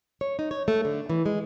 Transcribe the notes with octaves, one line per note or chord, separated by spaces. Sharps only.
C#5
D#4
C#5
A3
D3
E3
G#3